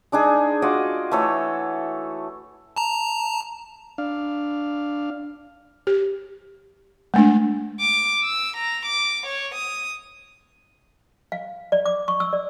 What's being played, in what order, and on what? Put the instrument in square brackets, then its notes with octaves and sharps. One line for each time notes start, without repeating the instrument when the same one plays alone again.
[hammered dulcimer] G#3 D4 D#4 G#4
F4 F#4 D5 D#5
E3 A3 A4 C#5
[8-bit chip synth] A5 A#5
[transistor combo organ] D4 F5
[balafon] G4
G#3 A3 D4
[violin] D6
E6
A#5
D6
C#5
D#6
[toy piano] F5
D5
D6
C#6
E6
D5